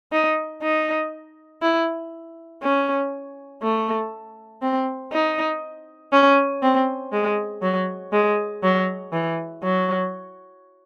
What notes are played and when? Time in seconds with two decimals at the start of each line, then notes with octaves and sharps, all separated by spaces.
0.12 D#4
0.62 D#4
1.62 E4
2.62 C#4
3.62 A3
4.62 C4
5.12 D#4
6.12 C#4
6.62 C4
7.12 G#3
7.62 F#3
8.12 G#3
8.63 F#3
9.13 E3
9.63 F#3